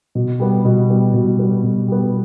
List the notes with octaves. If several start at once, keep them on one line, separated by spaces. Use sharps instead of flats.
B2
G3 B3
B2
G3 B3
B2
G3 B3
B2
G3 B3